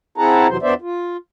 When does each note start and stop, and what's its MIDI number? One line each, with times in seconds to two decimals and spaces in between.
0.18 0.47 60
0.18 0.47 64
0.18 0.47 68
0.18 0.47 78
0.18 0.47 81
0.18 0.47 82
0.48 0.57 41
0.48 0.57 48
0.48 0.57 52
0.48 0.57 54
0.48 0.57 72
0.62 0.74 40
0.62 0.74 59
0.62 0.74 62
0.62 0.74 72
0.62 0.74 74
0.62 0.74 76
0.82 1.17 65